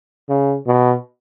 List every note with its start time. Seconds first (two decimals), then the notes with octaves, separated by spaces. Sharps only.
0.29 C#3
0.67 B2